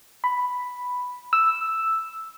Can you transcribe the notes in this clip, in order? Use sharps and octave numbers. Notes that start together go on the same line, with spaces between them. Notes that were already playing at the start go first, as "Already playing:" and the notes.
B5
E6